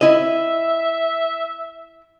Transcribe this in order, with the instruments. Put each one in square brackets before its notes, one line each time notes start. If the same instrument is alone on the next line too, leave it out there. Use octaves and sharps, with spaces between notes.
[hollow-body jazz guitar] E4 D#5 [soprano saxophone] E5